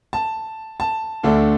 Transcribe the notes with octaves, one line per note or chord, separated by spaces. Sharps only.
A5
A5
D2 D3 A3 D4